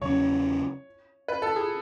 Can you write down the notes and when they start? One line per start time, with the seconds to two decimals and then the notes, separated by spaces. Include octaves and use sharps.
0.01 E2 C#3 F#3 C#4 C#5
1.28 B4
1.42 A4
1.56 G#4